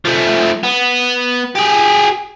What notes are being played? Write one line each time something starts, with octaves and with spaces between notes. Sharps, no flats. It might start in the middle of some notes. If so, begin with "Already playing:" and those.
F3 A3
B3
G4 G#4